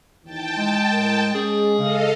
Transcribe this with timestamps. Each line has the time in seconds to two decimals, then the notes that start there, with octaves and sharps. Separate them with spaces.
0.24 D#2 D#3 E3 G5 A5
0.57 G#3
0.92 A2 A#4
1.35 G#3 C#4 G#4
1.79 C#3 A4 D#5 F5